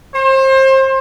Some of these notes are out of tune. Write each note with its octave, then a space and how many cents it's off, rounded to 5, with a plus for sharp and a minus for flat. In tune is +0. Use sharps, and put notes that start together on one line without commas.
C5 +30